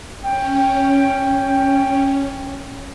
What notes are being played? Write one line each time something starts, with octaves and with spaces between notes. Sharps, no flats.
C#4 G5